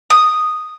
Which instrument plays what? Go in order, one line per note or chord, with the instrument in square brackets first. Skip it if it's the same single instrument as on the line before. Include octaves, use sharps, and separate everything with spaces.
[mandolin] D#6